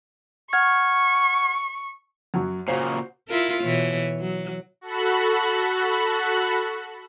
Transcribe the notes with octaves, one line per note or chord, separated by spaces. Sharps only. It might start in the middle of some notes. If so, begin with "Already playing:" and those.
F#5 C#6 F6 G#6
F#2 F#3
A#2 C#3 F#4 C5
E4 F4 A#4
B2 E3 C#5
F#3
F#4 A4 B5 F#6